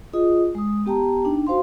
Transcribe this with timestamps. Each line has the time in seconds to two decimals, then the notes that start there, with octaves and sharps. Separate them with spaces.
0.13 F4 G#4 D#5 D#6
0.55 G#3 D#6
0.86 B3 G4 G5 A5 A#5
1.25 D4 D#4 G5
1.47 F#4 C5 F5 C6